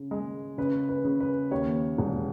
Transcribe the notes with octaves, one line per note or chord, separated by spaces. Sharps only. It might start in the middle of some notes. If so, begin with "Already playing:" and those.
Already playing: C#3
G#3
C#3 B4
B4
C#3
B4
D#2 C#5
E1